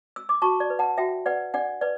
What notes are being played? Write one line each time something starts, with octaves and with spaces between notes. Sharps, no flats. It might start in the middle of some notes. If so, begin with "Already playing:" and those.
E6
D6
F#4 A5 C#6
D5
B4
F#5 A5
F#4 E5 G5
B4 D5 F#5
D4 D5 F#5
B4 D5